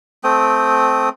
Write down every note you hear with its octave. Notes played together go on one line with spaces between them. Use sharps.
A3 C4 G5 D#6